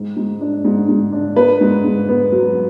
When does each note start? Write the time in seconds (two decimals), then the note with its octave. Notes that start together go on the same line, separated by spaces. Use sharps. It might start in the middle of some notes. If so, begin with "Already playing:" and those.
Already playing: G#2
0.16 G#2
0.41 D4
0.65 G#2
0.88 G#2
1.12 D4
1.36 B3 B4
1.61 G#2
1.85 G#2
2.09 B3
2.32 F#3